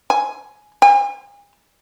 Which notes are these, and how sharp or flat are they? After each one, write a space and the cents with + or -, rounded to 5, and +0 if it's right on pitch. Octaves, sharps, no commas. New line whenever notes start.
G#5 +15
G#5 -40